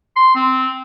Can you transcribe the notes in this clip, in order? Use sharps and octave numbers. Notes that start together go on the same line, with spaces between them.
C6
C4